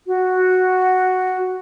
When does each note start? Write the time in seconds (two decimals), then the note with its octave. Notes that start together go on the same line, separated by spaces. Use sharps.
0.07 F#4